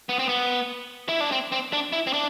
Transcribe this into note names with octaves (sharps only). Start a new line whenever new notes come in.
B3
C4
B3
E4
D4
C4
C4
D4
E4
C4
D4